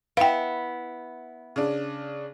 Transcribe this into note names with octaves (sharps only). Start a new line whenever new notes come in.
B3 E4 F5 G5
C#3 D4